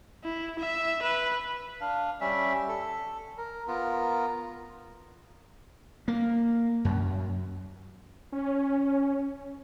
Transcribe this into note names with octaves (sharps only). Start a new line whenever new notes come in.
E4
E5
B4
D4 F5
G3 C#4 E5
A4
A#4
B3 F4 A#4
A#3
F#2
C#4